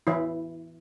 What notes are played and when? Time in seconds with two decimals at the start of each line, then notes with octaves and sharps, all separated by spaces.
0.07 E3 E4